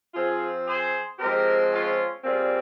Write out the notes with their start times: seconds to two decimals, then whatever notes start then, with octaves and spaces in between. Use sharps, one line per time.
0.14 F3 C4 F4 G#4
0.67 G#4 C5
1.19 F3 G#3 C4 G4 A#4
1.71 C#4 F4
2.23 A#2 G3 C4 F4 G#4